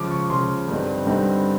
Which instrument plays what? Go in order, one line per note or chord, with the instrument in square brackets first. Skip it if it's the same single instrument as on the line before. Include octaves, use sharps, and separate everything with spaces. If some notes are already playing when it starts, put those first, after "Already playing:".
Already playing: [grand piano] C#3 F3 G#3 D6
C#6
C#3 F3 G#3 C6
G2 D3 G3 C4 D#4
G2 D3 G3 C4 D#4